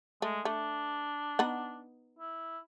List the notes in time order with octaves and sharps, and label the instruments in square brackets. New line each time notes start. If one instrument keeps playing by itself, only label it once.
[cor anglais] G#3 [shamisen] A3
[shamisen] A3 [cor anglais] D4
[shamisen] B3 D#4 F#5
[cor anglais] E4